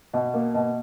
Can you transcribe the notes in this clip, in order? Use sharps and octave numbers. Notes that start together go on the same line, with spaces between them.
B2
A#3
B2